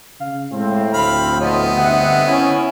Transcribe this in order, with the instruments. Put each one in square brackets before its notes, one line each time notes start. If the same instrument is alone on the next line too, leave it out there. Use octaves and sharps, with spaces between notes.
[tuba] C#3 [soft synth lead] F5
[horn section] A2 C4 [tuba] G#3
[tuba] D2 [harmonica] F5 B5 [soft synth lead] F6
[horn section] A2 F3 [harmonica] B3 C4 D#5 [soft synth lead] C#5
[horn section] G2 E5 F#5 [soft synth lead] D3
[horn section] C#4 E4